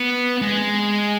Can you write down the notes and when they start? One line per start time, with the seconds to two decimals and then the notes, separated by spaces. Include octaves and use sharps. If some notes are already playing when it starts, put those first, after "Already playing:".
Already playing: B3
0.42 G#3